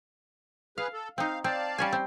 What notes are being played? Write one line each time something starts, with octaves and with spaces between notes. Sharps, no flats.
G#4 B4 F5
A4
C4 D#4 F5
C4 D5 F5 A5
G3 C#4 G#5
C4